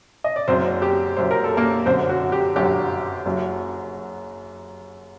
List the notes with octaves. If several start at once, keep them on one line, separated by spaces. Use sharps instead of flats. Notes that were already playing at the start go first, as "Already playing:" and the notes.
D#5
D5
F#1 F#2 F#3 C4 C5
G4
F#1 F#2 F#3 C5
A#4
A4
A#3 A#4
G1 F#2 D3 F#3 C4 C5
F#4
G4
G1 F#2 D3 F#3 G4
F#1 F#2 F#3